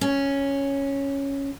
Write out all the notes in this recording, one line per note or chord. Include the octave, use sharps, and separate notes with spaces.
C#4